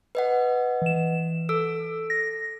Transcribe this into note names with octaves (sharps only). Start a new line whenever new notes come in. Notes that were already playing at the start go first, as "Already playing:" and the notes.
B4 D#5 F#5
E3 E7
A4 E6
A#6